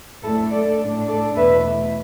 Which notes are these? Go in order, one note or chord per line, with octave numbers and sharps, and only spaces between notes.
A2 A3 D4 E4 A4
A4 D5
A2 A3 D4
A4 D5
E2 B2 A3 B4 E5